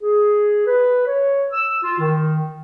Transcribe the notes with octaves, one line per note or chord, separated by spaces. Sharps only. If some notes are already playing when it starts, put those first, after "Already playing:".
G#4
B4
C#5
E6
F4
D#3